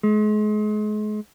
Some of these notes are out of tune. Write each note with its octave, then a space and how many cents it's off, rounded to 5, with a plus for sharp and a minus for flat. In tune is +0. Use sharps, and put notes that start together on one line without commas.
G#3 +35